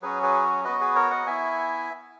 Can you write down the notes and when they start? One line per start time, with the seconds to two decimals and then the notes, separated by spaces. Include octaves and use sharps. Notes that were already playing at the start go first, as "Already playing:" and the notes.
0.02 F#3 C#4 F#4 G#4 B4
0.23 G#4 B4
0.64 B3 F#4 B4 D#5
0.80 G#4 B4
0.95 A#4 C#5
1.11 D#5 F#5
1.26 B3 E4 E5 G#5